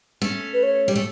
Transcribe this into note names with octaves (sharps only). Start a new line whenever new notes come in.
A3 C#4
B4
C#5
G3
A3